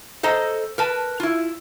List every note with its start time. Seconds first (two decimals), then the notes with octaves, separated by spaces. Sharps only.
0.23 A4 C5 D#5 A#5
0.78 A#4 B4 A5
1.20 E4 F4